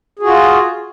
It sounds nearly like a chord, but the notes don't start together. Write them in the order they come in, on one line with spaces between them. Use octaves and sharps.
G#4 F#4 F4